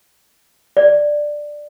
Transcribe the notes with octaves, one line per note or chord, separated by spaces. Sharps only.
D5